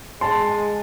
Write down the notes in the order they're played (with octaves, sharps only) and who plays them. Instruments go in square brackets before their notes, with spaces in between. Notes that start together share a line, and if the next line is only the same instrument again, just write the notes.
[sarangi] G#3 [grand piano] A5 C6